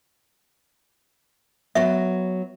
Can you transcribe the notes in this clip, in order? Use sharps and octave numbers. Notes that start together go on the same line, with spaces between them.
F#3 B3 E5